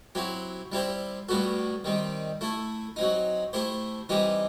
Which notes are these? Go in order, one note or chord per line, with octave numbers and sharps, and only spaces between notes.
F#3 C4 E4 G4
G3 C4 E4 G4 C5
A2 G3 B3 F#4 A4
D#3 G3 C4
A3 E4 A4
F#3 C4 D#4
A3 E4 G4 C5
E3 G3 C4 D#4 G4